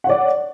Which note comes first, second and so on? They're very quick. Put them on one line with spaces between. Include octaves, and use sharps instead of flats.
F#5 C#5 D5